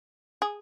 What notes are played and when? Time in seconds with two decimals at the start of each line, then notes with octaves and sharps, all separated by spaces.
0.42 G#4